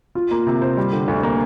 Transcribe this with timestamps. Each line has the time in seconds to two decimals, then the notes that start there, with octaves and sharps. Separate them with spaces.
0.15 F4
0.31 A#3
0.47 C3
0.62 C5
0.77 G3
0.92 D3
1.08 D2
1.23 A#3